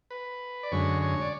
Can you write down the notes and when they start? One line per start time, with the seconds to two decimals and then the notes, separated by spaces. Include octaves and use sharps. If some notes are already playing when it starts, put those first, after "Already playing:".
0.11 B4
0.63 D5
0.72 F#2 D3 G#3 C#5
1.02 C#5
1.21 D5